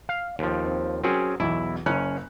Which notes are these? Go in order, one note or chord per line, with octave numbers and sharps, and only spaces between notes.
F5
D#2 F3
C4
F#3 C4 C#4 G#4 A#4
B1 E2 E4
F#1 C#4 F#6